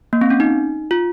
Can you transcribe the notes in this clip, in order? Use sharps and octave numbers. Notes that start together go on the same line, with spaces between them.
A#3
C4
C#4
D#4
F4